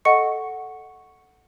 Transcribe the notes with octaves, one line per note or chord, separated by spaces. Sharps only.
A4 D#5 F#5 C#6 C#7